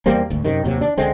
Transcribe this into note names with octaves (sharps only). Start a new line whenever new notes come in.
E2 G3 A#3 C4
G#1 D2
F#2 C3 D#3
D#2 C3 F#3
D4
C#2 D3 G#3 C4